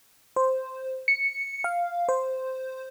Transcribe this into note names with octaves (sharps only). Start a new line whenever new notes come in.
C5
C#7
F5
C5